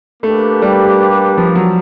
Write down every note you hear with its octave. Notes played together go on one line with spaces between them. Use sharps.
A3 A#3 D4 G4 B4
G3
F3
F#3